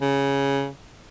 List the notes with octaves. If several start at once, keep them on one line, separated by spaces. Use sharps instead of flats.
C#3